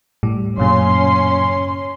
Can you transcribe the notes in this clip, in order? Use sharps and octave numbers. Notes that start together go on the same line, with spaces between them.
A2 G3
F#2 A#2 C#3 C#4 C6